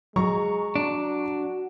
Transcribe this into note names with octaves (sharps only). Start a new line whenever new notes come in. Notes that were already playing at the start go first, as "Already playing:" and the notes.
F#3 G#3 A#5 C#6
D4 F#4